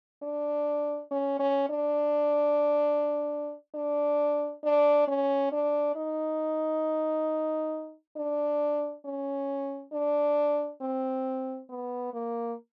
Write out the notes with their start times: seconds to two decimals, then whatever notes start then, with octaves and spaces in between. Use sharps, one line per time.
0.23 D4
1.11 C#4
1.39 C#4
1.69 D4
3.75 D4
4.64 D4
5.08 C#4
5.52 D4
5.96 D#4
8.17 D4
9.05 C#4
9.93 D4
10.81 C4
11.70 B3
12.14 A#3